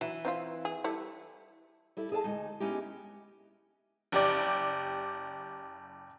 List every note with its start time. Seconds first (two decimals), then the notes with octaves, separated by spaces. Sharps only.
0.01 E3 F#3
0.25 C4 E4 F4
0.65 G#4
0.84 G3 E4 A4
1.97 G3 E4 A4
2.12 G#4 A4 F5 A5
2.24 D2 G#3 D#4
2.60 G#3 B3 C#4 D#4 E4 G4
4.12 F#1 G4 D5